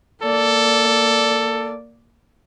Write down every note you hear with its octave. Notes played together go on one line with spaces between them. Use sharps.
A#3 A4 D5